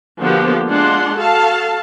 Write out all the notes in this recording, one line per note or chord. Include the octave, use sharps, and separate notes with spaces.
D3 F3 A#3 B3 F#4 G4
G#3 D4 F4 F#5 C6
F#4 A4 F5 A5